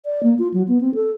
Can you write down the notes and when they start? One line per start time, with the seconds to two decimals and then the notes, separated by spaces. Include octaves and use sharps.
0.05 D5
0.23 A#3
0.39 F4
0.54 F#3
0.68 B3
0.81 C4
0.95 A4